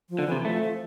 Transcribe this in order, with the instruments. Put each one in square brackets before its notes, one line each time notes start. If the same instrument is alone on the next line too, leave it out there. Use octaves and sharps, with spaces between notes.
[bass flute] F3
[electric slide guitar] D3
[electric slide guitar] C3 [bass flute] E3
[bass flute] F3 [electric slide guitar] A3
[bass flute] F3